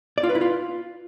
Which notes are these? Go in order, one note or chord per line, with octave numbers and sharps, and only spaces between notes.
D5
F4
B4
E4
F4